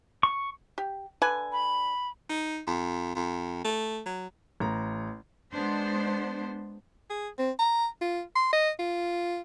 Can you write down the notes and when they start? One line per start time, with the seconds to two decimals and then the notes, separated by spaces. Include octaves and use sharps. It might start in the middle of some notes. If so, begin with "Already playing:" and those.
0.23 C#6
0.78 G4
1.22 D3 B4 G#5
1.52 B5
2.29 D#4
2.67 F2
3.15 F2
3.64 A3
4.06 F#3
4.60 A1 A#5
5.53 G#3 B3 D4 C5
7.10 G#4
7.39 C4
7.59 A#5
8.01 F4
8.36 C6
8.53 D#5
8.79 F4